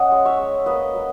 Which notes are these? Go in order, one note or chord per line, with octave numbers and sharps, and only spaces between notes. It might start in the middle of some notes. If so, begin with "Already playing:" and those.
Already playing: C#4 D#5 F#5
G#3
C#5 E5
G#3
A#3 B4 D#5
F#3